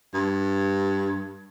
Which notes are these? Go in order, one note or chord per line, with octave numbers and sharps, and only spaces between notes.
G2